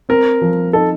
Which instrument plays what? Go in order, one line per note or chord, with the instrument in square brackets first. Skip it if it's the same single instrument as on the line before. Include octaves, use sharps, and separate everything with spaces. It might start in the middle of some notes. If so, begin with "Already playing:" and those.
[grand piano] C4 [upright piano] A#4
[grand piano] F3
[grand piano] D#4 [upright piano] A4